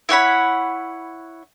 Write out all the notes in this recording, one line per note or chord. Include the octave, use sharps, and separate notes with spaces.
E4 C#5 F#5 B5